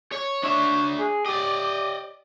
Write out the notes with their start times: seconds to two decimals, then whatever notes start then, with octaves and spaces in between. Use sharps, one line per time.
0.12 C#5
0.43 D4 C#5 E5
0.99 G#4
1.26 G4 D5 D#5